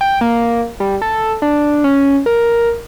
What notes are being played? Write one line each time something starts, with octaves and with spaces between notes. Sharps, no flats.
G5
A#3
G3
A4
D4
C#4
A#4